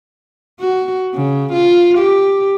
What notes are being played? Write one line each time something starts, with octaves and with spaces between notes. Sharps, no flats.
F#4
C#3
F4
G4